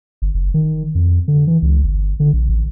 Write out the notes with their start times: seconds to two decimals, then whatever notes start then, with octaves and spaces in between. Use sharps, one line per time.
0.22 G1
0.34 F#1
0.54 D#3
0.95 F2
1.28 D3
1.47 E3
1.62 C#2
1.84 G1
2.20 D3
2.33 A#1
2.49 A1